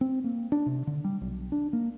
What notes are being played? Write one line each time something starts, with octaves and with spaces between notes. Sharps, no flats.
C4
A#3
D4
C3
D3
G3
B1
D4
A#3